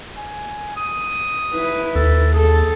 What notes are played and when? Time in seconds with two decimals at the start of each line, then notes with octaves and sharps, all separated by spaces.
0.17 G#5
0.77 D#6
1.53 E4 B4
1.96 D#2 A4
2.34 G#4 A4